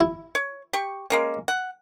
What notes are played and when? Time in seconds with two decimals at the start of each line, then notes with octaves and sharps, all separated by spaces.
0.01 E4
0.35 C#5
0.73 G4 C#6
1.10 G#3 A#3 C#4
1.48 F#5